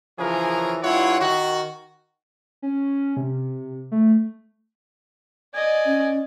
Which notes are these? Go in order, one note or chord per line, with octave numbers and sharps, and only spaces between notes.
C#3 E3 F3 C#4 G#4 A#4
G2 E4 F4 C#5 F#5
D#3 F#4
C#4
C3
A3
D5 D#5 G#5
C#4